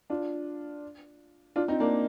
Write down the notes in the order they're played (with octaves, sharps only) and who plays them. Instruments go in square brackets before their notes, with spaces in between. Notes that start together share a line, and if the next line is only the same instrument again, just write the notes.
[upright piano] D4 F4
D4 F4
C4 D#4
A#3 D4